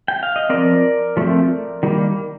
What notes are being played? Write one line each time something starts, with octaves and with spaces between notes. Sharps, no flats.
G5
F5
D#5
F3 C4 A#4 D5
F3 A3 C4
D#3 G3 A#3